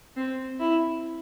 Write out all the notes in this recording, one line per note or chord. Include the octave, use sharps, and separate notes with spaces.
C4
E4